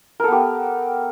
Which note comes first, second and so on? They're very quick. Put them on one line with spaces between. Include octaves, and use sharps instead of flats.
A#4 A4 B3 G4